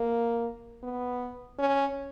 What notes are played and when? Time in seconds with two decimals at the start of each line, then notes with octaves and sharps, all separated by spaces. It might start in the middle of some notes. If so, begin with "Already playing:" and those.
Already playing: A#3
0.83 B3
1.59 C#4